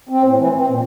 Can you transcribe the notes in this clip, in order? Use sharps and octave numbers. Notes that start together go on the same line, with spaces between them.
C4
A2
E3
C4
A#2